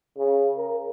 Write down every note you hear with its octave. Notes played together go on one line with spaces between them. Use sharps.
C#3
A#4